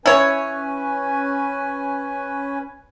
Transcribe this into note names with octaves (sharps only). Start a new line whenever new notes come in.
C#4 E4 B4 C#5 G#5